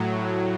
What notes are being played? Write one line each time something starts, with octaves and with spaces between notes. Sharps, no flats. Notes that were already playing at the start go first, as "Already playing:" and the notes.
Already playing: A2 F#3